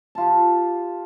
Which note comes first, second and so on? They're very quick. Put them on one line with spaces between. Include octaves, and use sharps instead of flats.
A5 F4 G4